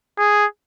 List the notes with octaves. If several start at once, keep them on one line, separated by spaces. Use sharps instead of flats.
G#4